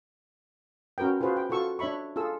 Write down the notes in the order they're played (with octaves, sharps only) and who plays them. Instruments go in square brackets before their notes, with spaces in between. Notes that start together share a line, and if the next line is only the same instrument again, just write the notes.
[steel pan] C#4 F#4 A#4 B4 G5
F4 F#4 G#4 B4 C5
G5
F4 F#4 A4 C#6 E6
D4 C#5 E5 B5 C#6
F4 G#4 A4 E6